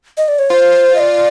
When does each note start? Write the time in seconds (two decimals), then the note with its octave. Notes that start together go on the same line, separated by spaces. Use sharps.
0.18 D#5
0.28 D5
0.39 C#5
0.50 F4 C5
0.95 D#5
1.00 D5